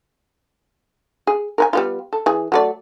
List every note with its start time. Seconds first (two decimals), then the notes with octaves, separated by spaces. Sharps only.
1.27 G#4
1.58 A#4 B4 G#5
1.73 G3 B3 F4
2.13 A4
2.26 E3 G#4
2.52 F#3 A3 D5